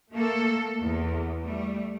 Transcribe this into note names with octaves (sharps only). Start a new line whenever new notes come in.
A3 A#3 A4
E2
G3 A3